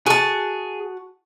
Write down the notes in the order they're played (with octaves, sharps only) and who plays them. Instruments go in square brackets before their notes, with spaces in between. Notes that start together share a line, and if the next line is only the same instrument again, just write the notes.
[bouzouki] F#4 A5 [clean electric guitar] G#4